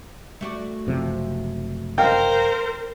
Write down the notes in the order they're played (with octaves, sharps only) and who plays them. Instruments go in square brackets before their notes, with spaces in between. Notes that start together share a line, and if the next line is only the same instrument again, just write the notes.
[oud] A3 F#4 D5
[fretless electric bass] F#1 C3 F3
[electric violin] A#4 C5 [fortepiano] F5 G5